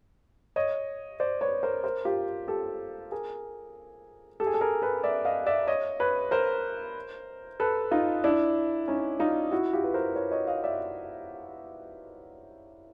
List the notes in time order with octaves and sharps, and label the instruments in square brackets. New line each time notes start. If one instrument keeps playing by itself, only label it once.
[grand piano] C#5 D#5
C5 D5
B4 C#5
A#4 C5
A#4 C5
F4 G4
G4 A4
G#4 A#4
G4 A4
G#4
A4
G#4 A#4
A4 B4
D5 E5
D#5 F5
D5 E5
C#5 D#5
B4 C#5
A#4 C5
A4 B4
D#4 F4
D4 E4
C#4 D#4
D#4 F4
E4 F#4
F4 G4
B4
A#4 C5
B4 C#5
C#5 D#5
D#5 F5
D5 E5